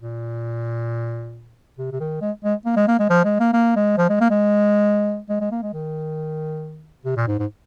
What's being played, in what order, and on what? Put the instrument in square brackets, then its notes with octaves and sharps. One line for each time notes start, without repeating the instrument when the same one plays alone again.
[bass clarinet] A#2
C3
C3
D#3
G#3
G#3
A#3
G#3
A#3
G#3
F3
G#3
A#3
A#3
G#3
F3
G#3
A#3
G#3
G#3
G#3
A#3
G#3
D#3
C3
A#2
G#2
G#2